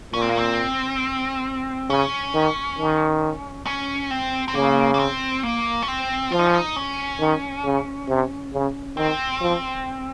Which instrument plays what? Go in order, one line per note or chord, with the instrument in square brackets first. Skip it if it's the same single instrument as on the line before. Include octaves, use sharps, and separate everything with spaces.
[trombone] A#2 [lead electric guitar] C#4
[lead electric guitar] C4
A#3
C4
[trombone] C#3 [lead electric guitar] C#4
[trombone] D#3
D#3
[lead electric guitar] C#4
C4
C4
[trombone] C#3 [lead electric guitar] A#3
[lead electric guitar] A#3
C4
A#3
C#4
C4
[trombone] F3 [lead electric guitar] F4
[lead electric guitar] D#4
C#4
D#4
C#4
[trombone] D#3
C#3
C3
C#3
[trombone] D#3 [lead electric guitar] C4
[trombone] F3